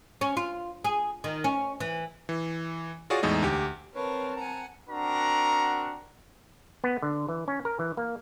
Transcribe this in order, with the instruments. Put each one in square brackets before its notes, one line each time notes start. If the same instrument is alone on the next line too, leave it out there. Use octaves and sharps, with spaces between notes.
[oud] C#4
F4
G#4
D#3
C#4
E3
[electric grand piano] E3
F4 F#4 G#4 C#5 D5
E2 A2 G#3 D#4
D2 G4
[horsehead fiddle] C4 A5 [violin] A#4 F5 [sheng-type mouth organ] B4 C#5
[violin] F#5 G#5 [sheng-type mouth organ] A#5
[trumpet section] C4 D4 F#4 A#4 F#5 A#5
[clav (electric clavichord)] B3
D3
E3
C#4
A#4
E3
A#3